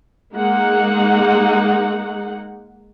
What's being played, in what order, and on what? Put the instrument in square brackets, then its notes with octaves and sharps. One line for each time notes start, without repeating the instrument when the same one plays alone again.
[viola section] G#3 A#3 D#4 F#5